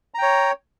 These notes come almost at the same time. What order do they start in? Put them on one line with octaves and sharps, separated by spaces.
A#5 G5 C#5